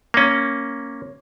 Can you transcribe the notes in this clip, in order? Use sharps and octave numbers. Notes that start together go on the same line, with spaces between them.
A#3 C#4